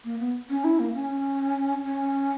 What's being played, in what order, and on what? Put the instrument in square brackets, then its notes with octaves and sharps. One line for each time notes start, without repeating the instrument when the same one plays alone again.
[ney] A#3
B3
C#4
E4
A#3
C#4
C#4